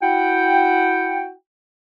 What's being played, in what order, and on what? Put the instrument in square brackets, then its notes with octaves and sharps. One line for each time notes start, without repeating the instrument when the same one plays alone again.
[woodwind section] E4 F#4 F#5 G5